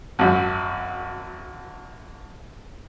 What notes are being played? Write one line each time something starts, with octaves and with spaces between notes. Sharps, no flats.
G#1 F#2 F#4